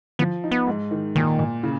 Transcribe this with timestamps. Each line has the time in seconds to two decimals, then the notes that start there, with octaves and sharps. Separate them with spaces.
0.19 F3 B3
0.44 D#4
0.51 B3
0.67 G#2
0.91 D#3
1.16 A#2 D#3
1.39 A#2
1.63 C#3